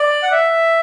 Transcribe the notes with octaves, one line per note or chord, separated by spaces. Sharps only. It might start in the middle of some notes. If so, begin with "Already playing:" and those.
Already playing: D5
F#5
E5